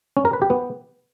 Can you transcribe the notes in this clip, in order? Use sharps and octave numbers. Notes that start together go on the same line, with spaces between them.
C#4
A#4
B4
G4
B3